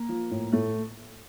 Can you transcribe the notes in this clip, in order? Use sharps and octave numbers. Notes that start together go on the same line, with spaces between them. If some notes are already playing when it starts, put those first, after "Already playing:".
Already playing: A#3
F3
A2
A2 A3